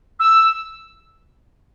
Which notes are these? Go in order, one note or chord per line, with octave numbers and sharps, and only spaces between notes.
E6